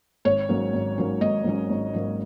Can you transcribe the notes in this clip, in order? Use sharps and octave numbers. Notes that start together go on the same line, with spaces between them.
G#1 C#5
G#2 F#3 A#3 C#4
G#1
G#2 F#3 A#3 C#4
G#1 D#5
G#2 F#3 A#3 C#4
G#1
G#2 F#3 A#3 C#4